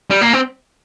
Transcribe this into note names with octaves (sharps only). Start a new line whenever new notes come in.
G3
A#3
C4